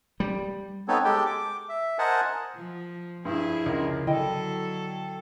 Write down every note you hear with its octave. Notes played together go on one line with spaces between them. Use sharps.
G3
B3 C4 D#4 A4 C#5
G#3 G4 A4 G5
D6
E5
A#4 C5 D#5 F#5 G#5 A5
F3
G2 F3 E4 G#4
C#2 A#4
D3 F#3 E4 A4 D#5 G5